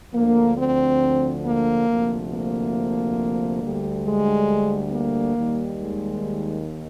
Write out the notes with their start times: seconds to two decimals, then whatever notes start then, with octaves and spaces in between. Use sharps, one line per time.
0.13 D2 D3 F3 A#3
0.57 C4
1.44 A#3
1.88 D2 C3 F3
2.31 A#3
3.62 D2 D3 G3
4.05 G#3
4.92 A#3
5.36 D#2 D#3 G3
5.80 G#3